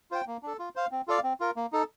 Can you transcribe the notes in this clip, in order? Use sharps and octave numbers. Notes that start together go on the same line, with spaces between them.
F4 C5 G5
A#3
D4 A4
F4
C5 F5
C4
F4 A4 D5 F5
C4
F4 A#4
A#3
D#4 A4